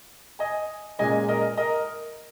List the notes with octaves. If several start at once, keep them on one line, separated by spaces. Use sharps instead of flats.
D#5 G#5
A#2 G#3 C#4 D#5 G#5
A#4 D#5
A#4 D#5